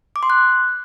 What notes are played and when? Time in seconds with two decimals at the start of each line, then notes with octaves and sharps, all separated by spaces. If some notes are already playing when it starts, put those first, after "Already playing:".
0.16 D6
0.23 C6
0.30 F#6